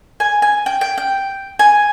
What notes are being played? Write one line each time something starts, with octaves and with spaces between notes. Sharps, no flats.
G#5
G#5
G5
G5
G5
G#5